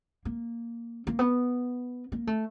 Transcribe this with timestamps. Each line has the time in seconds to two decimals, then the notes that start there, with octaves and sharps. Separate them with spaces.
0.25 A#3
1.07 A#3
1.19 B3
2.12 A#3
2.27 A3